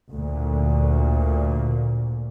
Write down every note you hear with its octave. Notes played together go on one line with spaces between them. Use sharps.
D2 A#2